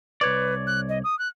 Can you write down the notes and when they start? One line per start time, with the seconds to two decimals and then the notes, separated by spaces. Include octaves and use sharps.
0.21 C2 B4 C#5 D5
0.67 F#6
0.89 D#5
1.04 D#6
1.19 F#6